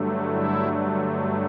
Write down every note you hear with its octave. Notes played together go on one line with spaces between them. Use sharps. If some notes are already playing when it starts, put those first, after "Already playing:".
Already playing: G2 D3 F#3 A3
E4